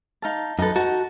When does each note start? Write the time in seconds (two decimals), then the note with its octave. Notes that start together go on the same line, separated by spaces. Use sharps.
0.22 D#4 F5 A5
0.59 F#2 D#4 A4 B4
0.76 D#4 F#4 F#5 A5